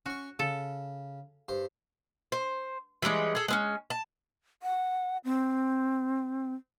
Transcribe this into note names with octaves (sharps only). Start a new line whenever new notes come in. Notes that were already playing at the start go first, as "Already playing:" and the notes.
C#4 F#4 C#6
C#3 A4
G2 C5
C5
E3 G3 G#3 C#4
G#4 A4
G#3 C4 C#4
A5
F#5
C4